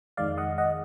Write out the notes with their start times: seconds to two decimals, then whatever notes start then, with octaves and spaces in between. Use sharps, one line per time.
0.17 F2 D#3 G#3 D5 F5
0.38 D#5 F#5
0.58 D#5 F#5